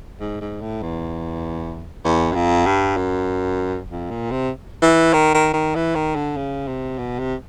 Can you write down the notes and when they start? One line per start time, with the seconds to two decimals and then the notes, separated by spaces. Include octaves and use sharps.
0.20 G#2
0.41 G#2
0.61 A2
0.82 E2
2.04 E2
2.32 F#2
2.35 F2
2.66 G2
2.97 F#2
3.90 F2
4.10 A#2
4.31 C3
4.82 E3
5.13 D#3
5.34 D#3
5.54 D#3
5.75 E3
5.95 D#3
6.15 D3
6.36 C#3
6.67 C3
6.98 B2
7.19 C3